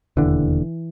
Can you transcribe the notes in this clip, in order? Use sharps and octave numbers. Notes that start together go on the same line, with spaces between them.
E1 D#2 D3 E3